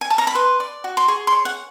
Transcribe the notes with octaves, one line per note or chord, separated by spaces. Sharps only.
G#5
A5
A#5
B5
B4 C6
D5
F#4
C6
G#4 C#6
C6
C#5
F#5